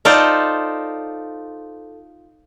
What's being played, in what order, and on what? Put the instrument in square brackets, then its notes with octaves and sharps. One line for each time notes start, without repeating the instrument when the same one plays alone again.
[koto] D#4 F4 A4 C5 D5